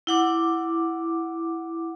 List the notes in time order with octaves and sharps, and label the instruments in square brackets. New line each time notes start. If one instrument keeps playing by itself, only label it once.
[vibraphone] E4 F#5 D6